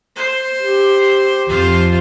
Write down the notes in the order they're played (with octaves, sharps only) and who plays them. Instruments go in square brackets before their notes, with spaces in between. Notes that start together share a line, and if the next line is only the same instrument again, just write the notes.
[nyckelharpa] C5
[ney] G4
[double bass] F2 [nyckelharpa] F4 C5